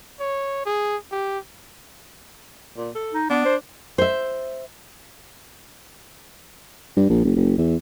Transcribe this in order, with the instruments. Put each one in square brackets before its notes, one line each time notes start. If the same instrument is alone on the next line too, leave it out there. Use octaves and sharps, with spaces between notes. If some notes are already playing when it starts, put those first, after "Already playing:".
[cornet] C#5
G#4
G4
[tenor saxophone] A#2
A4
[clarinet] D#4
[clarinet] B3 [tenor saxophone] D4
[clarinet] C5
[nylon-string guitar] C5 E5
[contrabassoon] G2
A#1
F#1
F#1
E2